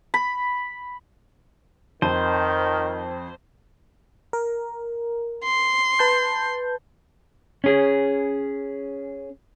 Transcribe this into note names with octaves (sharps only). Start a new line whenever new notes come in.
B5
F2 D#3 C5 D#7
A#4
C6
B4 A5 G6
C#4 G#4